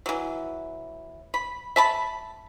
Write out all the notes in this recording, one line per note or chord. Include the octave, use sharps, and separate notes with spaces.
E3 F#3
B5
E5 A5 B5